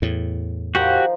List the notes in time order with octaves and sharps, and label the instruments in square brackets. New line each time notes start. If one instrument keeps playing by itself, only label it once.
[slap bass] E2 A2
[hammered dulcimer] D#3 F3 [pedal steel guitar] F#4 G4 F#5